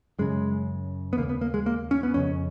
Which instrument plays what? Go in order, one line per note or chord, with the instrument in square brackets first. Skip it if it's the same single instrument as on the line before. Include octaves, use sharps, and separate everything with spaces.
[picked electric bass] F#2 C#3 G#3
B3
D#2 C#3 A#3
B3
A#3
G#3
A#3
C#4
B3
F2 C#3 C#4